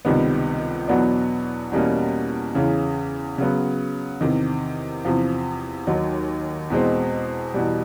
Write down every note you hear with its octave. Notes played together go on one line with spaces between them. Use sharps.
C#2 C3 D#3 G3 B3
E2 B2 F#3 B3 D4
E2 B2 G3 A#3 C#4
E2 C#3 E3
C#3 F#3 B3
E2 C3 D#3
E2 C3 F3
D#2 D#3 F#3
E2 B2 G#3 C4
E2 B2 G3